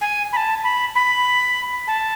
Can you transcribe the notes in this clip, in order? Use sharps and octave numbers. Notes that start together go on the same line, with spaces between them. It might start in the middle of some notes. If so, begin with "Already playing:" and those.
G#5
B5
A5
B5
B5
A5